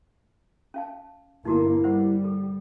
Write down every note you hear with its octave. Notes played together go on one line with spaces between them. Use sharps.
C#4 F5 A5
G1 A#3 D#4 E4 F#4 A#4
G3 B4 C5 F#5
A4